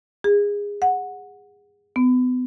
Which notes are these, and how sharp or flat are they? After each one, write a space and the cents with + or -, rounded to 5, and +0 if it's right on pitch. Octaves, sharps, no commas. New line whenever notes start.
G#4 -25
F#5 -10
B3 +30